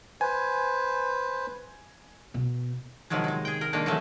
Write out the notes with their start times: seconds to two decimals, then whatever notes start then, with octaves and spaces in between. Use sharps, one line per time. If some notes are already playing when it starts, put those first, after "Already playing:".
0.21 B4 C5 G#5
2.34 B2
3.10 C3 D#3 F3 F#3 G#3
3.24 G#3 D#4
3.45 G#4 G5
3.61 A#4 G5
3.73 D#3 G#3 A#3 D4 D#4
3.86 E3 F#3 G#3 A3 C#4